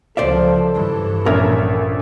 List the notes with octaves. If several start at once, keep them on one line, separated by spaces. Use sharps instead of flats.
C#2 F3 A4 C5 D5 E5
G2 E3
A#1 C#4 A#4 E5